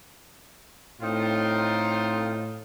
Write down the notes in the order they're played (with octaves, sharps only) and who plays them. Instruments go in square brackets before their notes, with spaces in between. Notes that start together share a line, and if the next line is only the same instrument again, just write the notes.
[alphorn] A2 [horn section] C4 D#4 F4